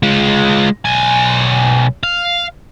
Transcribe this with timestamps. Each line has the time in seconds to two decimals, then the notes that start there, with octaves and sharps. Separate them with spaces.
0.03 G#3 F4
0.85 B1 G#5
2.03 F5